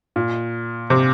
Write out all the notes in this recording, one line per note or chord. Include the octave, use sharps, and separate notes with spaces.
A#2
C3